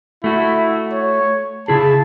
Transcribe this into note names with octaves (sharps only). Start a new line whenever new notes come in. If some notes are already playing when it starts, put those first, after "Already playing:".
A3 E4 F#4
C#5
C#3 E4 G#4 A5